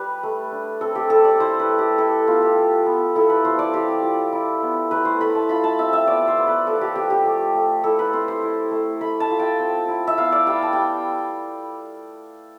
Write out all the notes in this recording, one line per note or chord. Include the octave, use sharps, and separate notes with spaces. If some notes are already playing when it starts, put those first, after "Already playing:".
Already playing: G3 B4
A3
D4
C4 A4
G4
G3 A4
D5
E4 C5
B4
A3
G4
E4 A4
B3 F4
G4
F4
B3
E4 A4
B4
F3 C5
D5
C4 G4
F4
E4
B3
A3 B4
C5
A3 B5
A5
F4 B5
A5
C4 E5
E5
B3 D5
C5
B3
B4
F3 A4
G4
C4 G4
G4
A3
A3
E4 A4
B4
C4 C5
C5
E4
A3
A3 B5
A5
F4
G5
C4
E4
E5
B3 F5
D5
G3 G5
A5
G3 G5